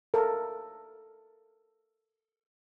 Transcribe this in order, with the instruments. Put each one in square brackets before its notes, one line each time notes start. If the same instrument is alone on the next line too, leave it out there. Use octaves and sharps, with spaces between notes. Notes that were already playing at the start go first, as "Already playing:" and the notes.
[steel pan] A4 A#4